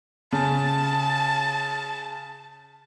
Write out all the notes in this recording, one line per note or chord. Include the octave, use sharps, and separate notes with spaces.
C#3 A5